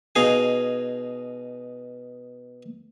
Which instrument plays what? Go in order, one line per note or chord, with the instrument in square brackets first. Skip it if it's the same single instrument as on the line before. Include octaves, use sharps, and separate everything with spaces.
[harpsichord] B2 D#4 G#4 F5 G#5